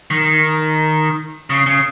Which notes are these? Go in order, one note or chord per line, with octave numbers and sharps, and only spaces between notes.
D#3
C#3
C#3